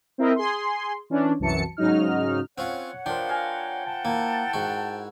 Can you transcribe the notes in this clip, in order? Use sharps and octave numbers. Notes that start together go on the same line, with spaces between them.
C4 E4 A#4 D#5 E5
G#4 C6
E3 C#4 D4
C2 F#2 E3 F#3 A5 C#7
G#2 C#3 F#3 D#4 F6
C4 C#4 F4 C#5 F#5
F3 D4 A#4 C5 G5
F5 G#5 A#5
F#5 A5
A#3 E4
G#2 F#4